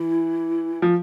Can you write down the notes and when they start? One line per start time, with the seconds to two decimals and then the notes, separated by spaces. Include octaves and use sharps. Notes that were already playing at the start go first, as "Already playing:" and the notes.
Already playing: E3 E4
0.82 F3